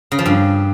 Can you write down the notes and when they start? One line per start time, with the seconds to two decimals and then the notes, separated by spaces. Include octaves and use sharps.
0.12 C#3
0.19 F3
0.26 G2